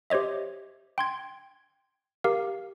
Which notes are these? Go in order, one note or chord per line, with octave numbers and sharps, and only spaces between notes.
G4 C5 C#5 D#5 E5
G5 C6 G#6
G4 A#4 F5